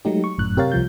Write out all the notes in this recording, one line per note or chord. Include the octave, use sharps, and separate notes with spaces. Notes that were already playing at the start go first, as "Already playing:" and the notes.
F#3 G#3 A3 D#4 G4
C#6
G1 F#2 A2 F#6
C3 G4 A#4 C#5 F5 A6
C2 F3 G6